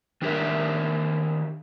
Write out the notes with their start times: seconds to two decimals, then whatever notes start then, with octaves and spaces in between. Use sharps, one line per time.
0.22 D#3 D4 G4 A#4 E5